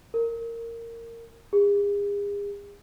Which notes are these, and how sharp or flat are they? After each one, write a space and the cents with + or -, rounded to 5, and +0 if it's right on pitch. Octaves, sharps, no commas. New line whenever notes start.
A#4 -15
G#4 -40